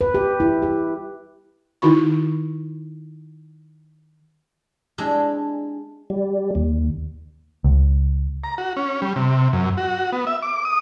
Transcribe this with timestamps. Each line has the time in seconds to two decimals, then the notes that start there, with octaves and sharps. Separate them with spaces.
0.01 B4
0.14 G4
0.40 E4
0.62 G4
1.82 D#3 D#4 E4 F#4 B5 C#6
4.98 G#3 C4 D4 E4 G4 G#4
6.10 G3
6.55 D#2
7.64 C#2
8.44 A#5
8.58 F#4
8.77 C#4
9.02 G3
9.16 C3
9.53 F#2
9.77 F#4
10.12 B3
10.27 E5
10.42 D6
10.65 D#6